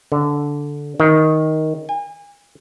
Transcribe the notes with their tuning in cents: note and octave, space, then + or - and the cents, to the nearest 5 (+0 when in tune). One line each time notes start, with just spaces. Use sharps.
D3 -10
D#3 +10
G#5 -35